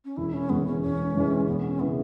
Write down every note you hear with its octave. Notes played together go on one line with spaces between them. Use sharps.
C#4
E1 E4
C#4
E2 E3 G#3 B3
C#4
E1 C#4
E2 E3 G#3
E1 B3
C#4
C#3 E3 B3